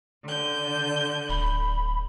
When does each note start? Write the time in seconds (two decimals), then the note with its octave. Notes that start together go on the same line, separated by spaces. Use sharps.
0.23 D3 G6
1.29 D1 B5